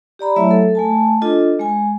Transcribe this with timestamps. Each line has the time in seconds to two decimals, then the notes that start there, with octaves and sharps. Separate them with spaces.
0.19 G4 D5 A#5 B5
0.36 F#3 A3 E4 C#5 E5
0.51 A4
0.75 A3 G#5 A5
1.22 D4 F4 A4 D#5
1.59 G#3 G#5